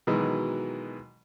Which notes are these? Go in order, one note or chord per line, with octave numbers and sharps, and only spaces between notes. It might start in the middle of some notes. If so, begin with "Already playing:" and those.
B2 D#3 E3 F#3 G#3